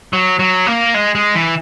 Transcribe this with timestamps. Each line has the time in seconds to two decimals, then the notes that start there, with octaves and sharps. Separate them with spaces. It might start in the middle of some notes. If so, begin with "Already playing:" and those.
0.13 F#3
0.39 F#3
0.67 A#3
0.94 G#3
1.15 G#3
1.35 E3